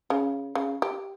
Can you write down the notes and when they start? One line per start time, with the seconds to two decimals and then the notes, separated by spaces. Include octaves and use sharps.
0.10 C#3
0.55 C#3
0.82 G4